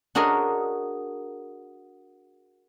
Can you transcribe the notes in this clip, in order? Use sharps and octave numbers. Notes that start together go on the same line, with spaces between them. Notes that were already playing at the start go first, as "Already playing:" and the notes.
D4 F#4 G#4 A#4 C#5 D#5